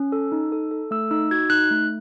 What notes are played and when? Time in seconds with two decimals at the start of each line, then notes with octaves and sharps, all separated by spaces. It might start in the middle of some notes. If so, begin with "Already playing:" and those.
Already playing: C#4
0.12 A4
0.32 D#4
0.52 A4
0.71 A4
0.91 A3 E6
1.11 D#4 E6
1.31 F#4 G#6
1.50 D#4 F#6
1.71 A3